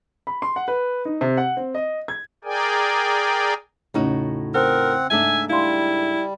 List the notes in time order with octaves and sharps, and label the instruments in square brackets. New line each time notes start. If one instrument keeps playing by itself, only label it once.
[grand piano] B5
C6
F#5
B4
D#4
C3
F#5
C4
D#5
G#6
[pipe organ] G#4 A#4 D5 G5 G#5
[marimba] E2 C#3 C#4 [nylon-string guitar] A2 D#4 F#4
[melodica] C4 F#5 [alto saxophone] A#4 [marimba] C5
[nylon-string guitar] G#2 A3 D4 [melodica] E5 [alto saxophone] G#5
[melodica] G3 [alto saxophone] E4 [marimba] F5 C6